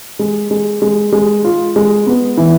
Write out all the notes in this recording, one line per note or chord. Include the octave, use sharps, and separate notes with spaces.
G#3
G#3
G#3
G#3
F4
G#3
B3
E3